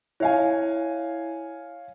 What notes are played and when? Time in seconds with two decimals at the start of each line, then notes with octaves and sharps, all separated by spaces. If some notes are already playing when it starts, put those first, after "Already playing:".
0.20 E4 C#5 F5 G#5